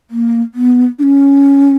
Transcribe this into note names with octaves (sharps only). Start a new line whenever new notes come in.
A#3
B3
D4
C#4